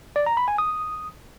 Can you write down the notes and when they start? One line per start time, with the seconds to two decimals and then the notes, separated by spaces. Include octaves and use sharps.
0.16 D5
0.26 A#5
0.37 B5
0.48 G#5
0.58 D#6